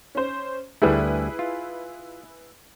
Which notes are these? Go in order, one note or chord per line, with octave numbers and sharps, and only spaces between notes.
C#4 C5
D2 G3 A3 E4 G#4 B4
F4